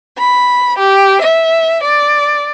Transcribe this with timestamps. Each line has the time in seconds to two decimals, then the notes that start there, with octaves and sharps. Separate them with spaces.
0.17 B5
0.77 G4
1.21 E5
1.83 D5